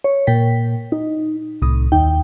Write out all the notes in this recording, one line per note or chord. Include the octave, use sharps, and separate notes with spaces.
C#5
A#2 G5 B6
D#4
C2 A2 D#6
D#2 D#4 G5